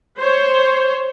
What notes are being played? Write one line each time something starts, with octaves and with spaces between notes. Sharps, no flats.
C5 C#5